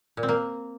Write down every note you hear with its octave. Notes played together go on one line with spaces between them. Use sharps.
A#2
C4
A#3